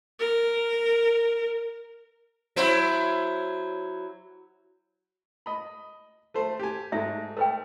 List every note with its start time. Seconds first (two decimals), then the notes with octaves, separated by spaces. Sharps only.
0.20 A#4
2.56 F#3 E4 C5
5.46 D#5 B5
6.34 A3 A4 C5
6.59 G4 G#5
6.92 G#2 A3 E5
7.37 A3 A#4 B4 G5